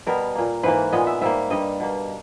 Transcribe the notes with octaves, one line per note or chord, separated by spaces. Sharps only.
B2 G3 B3 A#4
A#2 A#3
G#2 E3 A#3 B4
A#2 G#3 B3 D#5
E5
G#2 G3 A#3 E5
G2 G3 A#3 D#5
B2 A#3